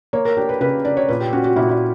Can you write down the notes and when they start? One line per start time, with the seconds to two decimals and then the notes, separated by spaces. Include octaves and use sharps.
0.13 A#3 C#5
0.25 A#4
0.37 D4 G4
0.49 B4
0.61 C#3 B4
0.85 D4 D5
0.97 C#5
1.09 A#2 B4
1.20 G4
1.33 C#4 F#4
1.44 F#4
1.56 A#2 E4
1.69 E4